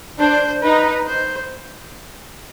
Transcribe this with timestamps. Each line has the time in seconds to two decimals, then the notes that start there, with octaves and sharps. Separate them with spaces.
0.19 D4 C5
0.63 D#4 B4
1.07 C5